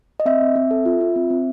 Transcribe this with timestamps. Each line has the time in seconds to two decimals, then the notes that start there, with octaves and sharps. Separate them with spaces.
0.20 D#5
0.26 C4 E5
0.41 C4
0.56 C4
0.71 A4
0.86 F4
1.01 F4
1.16 C4
1.30 C4